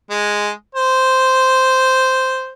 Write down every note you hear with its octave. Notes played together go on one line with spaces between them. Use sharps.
G#3
C5